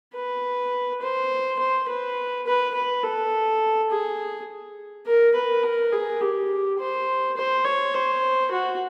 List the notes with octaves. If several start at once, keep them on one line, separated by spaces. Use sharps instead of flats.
B4
C5
C5
B4
B4
B4
A4
G#4
A#4
B4
A#4
G#4
G4
C5
C5
C#5
C5
F#4